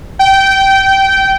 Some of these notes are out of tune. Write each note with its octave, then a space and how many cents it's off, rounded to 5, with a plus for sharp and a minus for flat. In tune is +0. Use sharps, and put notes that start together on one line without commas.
G5 -20